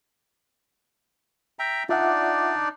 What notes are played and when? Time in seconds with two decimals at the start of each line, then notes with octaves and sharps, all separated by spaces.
1.59 E5 G5 A#5
1.89 D4 D#4 F4 D5 E5 F#5